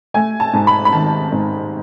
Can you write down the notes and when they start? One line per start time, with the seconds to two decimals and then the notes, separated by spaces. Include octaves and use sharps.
0.14 A3 G#5
0.40 A5
0.53 G#2
0.67 B5
0.85 B5
0.92 D#3 A5
1.32 G#2